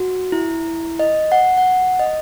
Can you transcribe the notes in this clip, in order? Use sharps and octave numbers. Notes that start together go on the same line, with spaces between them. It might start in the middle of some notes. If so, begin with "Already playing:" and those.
Already playing: F#4
E4
D#5
F#5
F#5
D#5